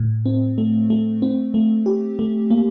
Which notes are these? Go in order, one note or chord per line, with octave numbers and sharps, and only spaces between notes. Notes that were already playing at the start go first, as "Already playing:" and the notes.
Already playing: A2
C4
A3
A3
C4
A3
G4
A3
A#3